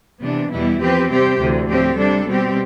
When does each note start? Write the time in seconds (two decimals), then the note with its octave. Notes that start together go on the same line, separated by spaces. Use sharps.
0.23 C3 E3 B3 D4
0.53 E2 B2 G3 B3 E4
0.81 F3 C4 G4 B4
1.11 C3 G3 C4 G4 C5
1.40 D2 C3 E3
1.69 A2 F3 C4 G4
1.98 C3 G3 D4 A4
2.27 B2 G3 C4 G4